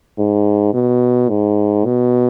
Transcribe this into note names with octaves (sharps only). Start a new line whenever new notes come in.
G#2
B2
G#2
B2